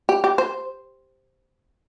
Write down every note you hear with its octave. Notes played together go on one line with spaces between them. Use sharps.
G4
G4
C5